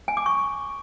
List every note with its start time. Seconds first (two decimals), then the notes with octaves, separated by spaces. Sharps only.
0.08 G#5
0.17 D6
0.26 C#6